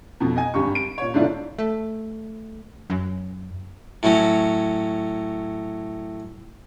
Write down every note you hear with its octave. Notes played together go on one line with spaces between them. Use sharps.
F2 B2
D#5 G#5
G#1 G2 C4 G4 C#6
D7
A#2 C#5
G#2 B2 D3 D4 E4 F4
A3
F#2
A2 F#3 C#4